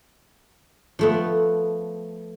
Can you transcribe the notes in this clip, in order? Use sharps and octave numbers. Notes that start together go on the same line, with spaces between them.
F3 A3 B3